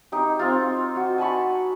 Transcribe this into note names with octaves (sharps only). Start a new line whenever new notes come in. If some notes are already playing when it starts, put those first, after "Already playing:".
D#4 G4
C4 F4
F#4
G#5 A5 B5 C#6